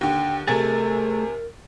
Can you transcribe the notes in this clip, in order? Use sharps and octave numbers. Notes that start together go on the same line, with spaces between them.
D#2 D3 G5
C3 A3 G#4 A#4 G#5 A6